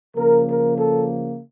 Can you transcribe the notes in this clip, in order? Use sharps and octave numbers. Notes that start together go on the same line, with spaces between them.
C#3 F3 A#3 A#4
A#4
A4